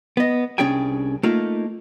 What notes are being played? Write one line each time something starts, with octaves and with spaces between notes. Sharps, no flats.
B3 D#5
C2 C#4 D4 G#4 G5 G#5
A3 A#3 D#4 F4